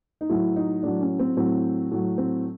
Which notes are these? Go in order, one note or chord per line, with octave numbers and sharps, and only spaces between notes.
D#4
A2 F#3 E4
D#4
A2 F#3 D4
C#4
C4
A2 F#3 C4
A2 F#3
C4